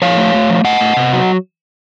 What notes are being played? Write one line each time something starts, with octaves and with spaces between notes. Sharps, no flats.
F3 C#5 F5
A3
A3
F3
A3 D#5 F#5
A3
C3
F#3